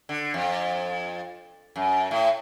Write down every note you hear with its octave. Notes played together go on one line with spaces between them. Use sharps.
D3
F2
F#2
A2